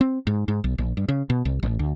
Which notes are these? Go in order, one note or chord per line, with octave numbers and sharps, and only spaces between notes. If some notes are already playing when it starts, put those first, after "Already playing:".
C4
G#2
G#2
B1
A#1
G2
C#3
B2
C2
A1
D2